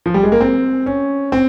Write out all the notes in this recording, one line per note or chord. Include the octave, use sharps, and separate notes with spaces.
F3
G3
G#3
A#3
C4
C#4
C4